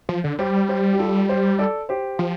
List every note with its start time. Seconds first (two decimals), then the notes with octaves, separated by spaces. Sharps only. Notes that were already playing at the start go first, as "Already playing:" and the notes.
0.09 F3
0.24 D3
0.39 G3 G4 C5
0.68 G4 C5
0.93 G4
0.99 F4 A4
1.29 G4 C5
1.59 A4 D5
1.89 G4 C5
2.19 F3